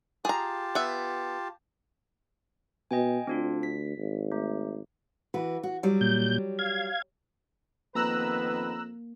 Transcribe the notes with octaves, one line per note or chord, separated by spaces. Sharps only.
F4 G4 G#4 A5 A#5
B3 E5
B2 D#5 G5 G#5
D2 C4 D4 F4
B6
G#1
A3
E3 F#4 B4
F#4
F#3 G3
A#2 G6
F5 G#6
F2 D#3 A#3 B3 B4 A#5 E6 F#6